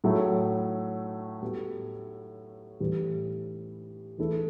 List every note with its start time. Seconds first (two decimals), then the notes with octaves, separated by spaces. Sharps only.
0.04 A2 F#3 A3
1.42 A2 G3 B3 F#4 A4
2.80 A2 E3 G3
4.18 E3 A3 E4 A4